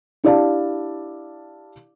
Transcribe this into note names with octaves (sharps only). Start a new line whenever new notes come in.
D4 E4 G4 D5 F5 A5